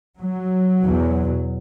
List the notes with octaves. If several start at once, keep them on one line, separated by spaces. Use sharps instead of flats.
F#3
E2 B2